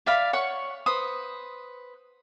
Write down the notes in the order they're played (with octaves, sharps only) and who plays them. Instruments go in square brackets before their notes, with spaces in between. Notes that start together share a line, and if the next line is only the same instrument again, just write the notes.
[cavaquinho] D5 E5 F5 B5
C#5 F#5 C#6
B4 C5 D#6